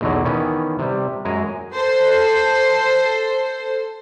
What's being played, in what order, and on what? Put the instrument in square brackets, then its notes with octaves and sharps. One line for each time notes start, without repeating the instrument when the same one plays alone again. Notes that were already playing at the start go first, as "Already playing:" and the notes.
[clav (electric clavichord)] B1 E2 B2 D3 F#3
D#3 E3 B3 C#4
C3 G3
F#2 G#3 G#5 A#5
[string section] A4 C5